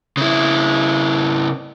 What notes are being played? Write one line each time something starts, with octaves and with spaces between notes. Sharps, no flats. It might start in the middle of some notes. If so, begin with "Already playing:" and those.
C#3 E4